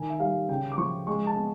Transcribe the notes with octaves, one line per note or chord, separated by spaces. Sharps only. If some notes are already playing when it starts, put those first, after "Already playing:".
Already playing: D#3 G#5
E5
G3 F5
C#3 G5
D6
F3 C#6
G#3 C#6
A5
B3